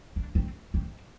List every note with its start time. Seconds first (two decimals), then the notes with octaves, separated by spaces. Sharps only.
0.16 D4
0.35 C4
0.74 C4